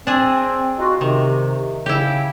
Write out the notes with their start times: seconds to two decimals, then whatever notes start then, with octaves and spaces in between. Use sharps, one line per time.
0.07 C4 D4 G#4
0.79 D#4 F4 F#4
1.01 C3 D#3
1.86 C#3 E4 G4